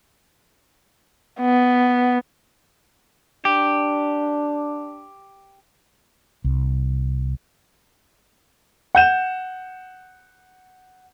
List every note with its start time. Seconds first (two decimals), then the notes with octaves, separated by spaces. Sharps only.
1.41 B3
3.45 D4 G4
6.44 C2
8.95 F#5 G6 E7